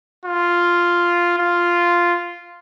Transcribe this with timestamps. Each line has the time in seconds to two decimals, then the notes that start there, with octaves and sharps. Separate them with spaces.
0.25 F4
1.38 F4